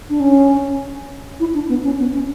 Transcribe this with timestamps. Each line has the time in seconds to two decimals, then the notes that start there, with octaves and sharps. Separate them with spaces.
0.10 D4
0.20 C#4
1.40 E4
1.55 D4
1.69 B3
1.84 C#4
1.99 B3
2.13 C#4